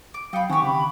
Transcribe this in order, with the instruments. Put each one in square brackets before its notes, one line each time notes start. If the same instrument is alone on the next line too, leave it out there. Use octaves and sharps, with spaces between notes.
[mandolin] D6
[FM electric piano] F#3 D#6 C#7 [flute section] F5 [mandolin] G5 B5
[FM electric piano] D#3 C4 G#5 [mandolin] G4 F#5 [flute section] C#6
[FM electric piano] C#3 [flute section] B5